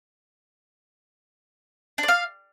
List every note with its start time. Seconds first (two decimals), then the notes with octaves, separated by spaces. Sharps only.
1.98 D4
2.03 D5
2.08 F5